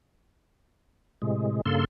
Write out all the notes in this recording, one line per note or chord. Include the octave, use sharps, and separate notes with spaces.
A2 C3 G#3
G2 C#3 A#3 A4 C6